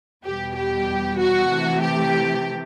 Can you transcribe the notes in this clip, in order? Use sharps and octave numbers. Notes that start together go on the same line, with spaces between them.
E2 B2 G3 G4
G4
F#4
C3 E3 A3
G4